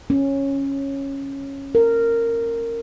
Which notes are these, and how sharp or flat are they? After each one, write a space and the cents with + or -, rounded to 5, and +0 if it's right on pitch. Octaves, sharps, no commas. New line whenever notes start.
C#4 -10
A#4 -15